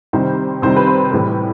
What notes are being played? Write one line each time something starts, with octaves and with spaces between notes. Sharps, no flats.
C3 D#3 G3 C5
C3 D#3 G3 C5
B4
C5
A2 E3 G3 B4